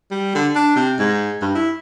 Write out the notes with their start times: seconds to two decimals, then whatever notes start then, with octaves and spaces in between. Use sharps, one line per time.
0.11 G3
0.35 D3
0.55 D4
0.76 C3
0.99 G#2
1.41 G2
1.55 E4